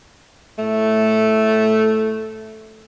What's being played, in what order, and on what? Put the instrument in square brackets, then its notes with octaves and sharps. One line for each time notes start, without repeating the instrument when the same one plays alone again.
[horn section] A2 A3